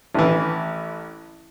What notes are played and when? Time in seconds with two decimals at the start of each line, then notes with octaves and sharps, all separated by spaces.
0.15 A1 E3